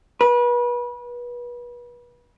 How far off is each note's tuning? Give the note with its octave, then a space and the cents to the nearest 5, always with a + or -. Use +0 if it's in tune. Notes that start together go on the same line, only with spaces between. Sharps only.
B4 -30